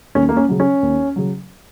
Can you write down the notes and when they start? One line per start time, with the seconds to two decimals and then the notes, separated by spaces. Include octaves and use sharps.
0.15 D#2 C#4
0.29 A#3
0.37 C#4
0.49 C#3 F#3
0.60 C#4
0.82 D#2
1.16 C#3 F#3